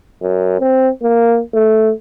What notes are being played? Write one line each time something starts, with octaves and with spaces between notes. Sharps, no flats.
F#2
C4
A#3
A3